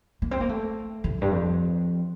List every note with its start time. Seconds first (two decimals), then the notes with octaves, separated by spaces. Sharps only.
0.22 A#3
0.31 C4
0.41 A#3
0.49 A3
1.04 D#3
1.13 F2
1.21 G2
1.31 F2